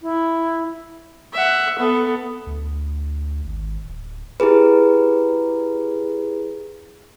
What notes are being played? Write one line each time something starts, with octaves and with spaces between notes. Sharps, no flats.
E4
E5 F#5
B3 A4
D2
G#1
D1
E4 G4 G#4 B4